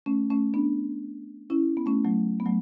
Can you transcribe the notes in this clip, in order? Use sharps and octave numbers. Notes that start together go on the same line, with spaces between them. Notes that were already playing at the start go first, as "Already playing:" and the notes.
A3 C#4
A3 C#4
B3 D4
C#4 E4
B3
A3 C#4
F#3 A3
B3
F#3 A3